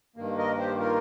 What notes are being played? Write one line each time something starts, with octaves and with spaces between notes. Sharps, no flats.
G2 D#3 A#3
A#4 D#5
G4 C5
F4 A#4